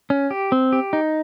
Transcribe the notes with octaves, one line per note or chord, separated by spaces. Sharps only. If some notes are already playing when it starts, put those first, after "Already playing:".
C#4
G4
C4
G4
D#4